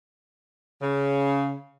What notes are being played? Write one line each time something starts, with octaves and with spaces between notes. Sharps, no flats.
C#3